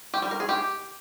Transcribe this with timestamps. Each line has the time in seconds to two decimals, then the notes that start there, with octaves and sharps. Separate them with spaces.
0.14 G4
0.22 G3
0.31 A#4
0.40 G#4
0.49 G4